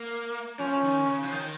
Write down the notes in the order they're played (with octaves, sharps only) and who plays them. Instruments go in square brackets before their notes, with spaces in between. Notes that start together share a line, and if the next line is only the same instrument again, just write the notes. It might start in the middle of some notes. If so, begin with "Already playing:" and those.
Already playing: [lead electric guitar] A#3
[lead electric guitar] F3 [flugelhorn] C#4
[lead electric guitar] D#3
C#3
F3
D#3